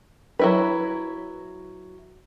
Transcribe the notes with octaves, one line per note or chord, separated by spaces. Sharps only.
F#3 E4 B4